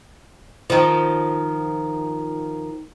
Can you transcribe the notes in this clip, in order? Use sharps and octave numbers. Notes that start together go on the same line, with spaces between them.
D#3 F3